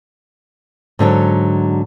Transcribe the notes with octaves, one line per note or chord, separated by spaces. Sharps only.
G#2 D3 F3 F#3